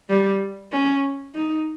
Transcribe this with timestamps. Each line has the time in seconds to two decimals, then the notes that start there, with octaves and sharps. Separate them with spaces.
0.10 G3
0.72 C#4
1.35 D#4